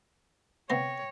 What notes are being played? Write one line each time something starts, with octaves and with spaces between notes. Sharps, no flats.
C3 B3 C5 C#5 G5 A#6